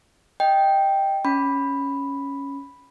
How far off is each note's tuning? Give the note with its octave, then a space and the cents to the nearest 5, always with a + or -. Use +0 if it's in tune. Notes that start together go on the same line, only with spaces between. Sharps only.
D#5 +0 G5 +0
C#4 +0 B5 +0